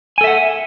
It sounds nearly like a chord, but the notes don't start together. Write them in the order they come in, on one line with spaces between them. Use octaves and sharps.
G#5 A4 E5 F#5